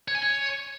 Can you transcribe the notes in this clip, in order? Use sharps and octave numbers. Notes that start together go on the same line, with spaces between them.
C#5
G#5
C#5